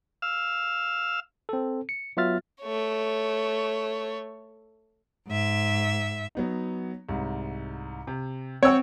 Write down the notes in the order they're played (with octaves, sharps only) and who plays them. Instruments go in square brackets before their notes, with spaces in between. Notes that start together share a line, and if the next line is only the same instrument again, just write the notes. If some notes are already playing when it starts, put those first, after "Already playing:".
[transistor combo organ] F5 E6
[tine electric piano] C4 A4
C#7
F#3 B3 F4 E5 F6 A6
[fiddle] A3 C#5
[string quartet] G#2 E5
[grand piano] F#3 B3 D#4
C2 G#2
C3
[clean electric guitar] C4 [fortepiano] C#5 E6 [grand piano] F#5 G5